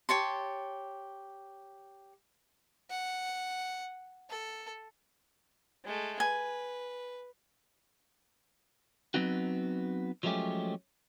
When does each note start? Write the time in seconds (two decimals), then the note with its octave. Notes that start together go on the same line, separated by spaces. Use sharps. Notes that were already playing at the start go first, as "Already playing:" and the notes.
0.09 G4 C#5 A5 C6
2.90 F#5
4.29 A4
5.85 G#3 A3
6.20 B4 G#5
9.14 F#3 B3 C4 D#4 F#4
10.23 F3 F#3 G#3 A3 C#4 G4